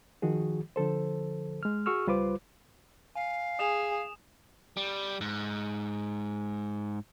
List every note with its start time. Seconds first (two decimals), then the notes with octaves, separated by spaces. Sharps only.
0.22 D#3 F3 F#4 G#4
0.76 D3 F3 A4 C5
1.63 G#3 F6
1.86 F#4 G#4 C#6 E6 F6
2.07 C#2 G3 F4 B4 C5 D6
3.16 F5 G#5
3.59 G#4 D#6 E7 F7
4.77 G3
5.21 G#2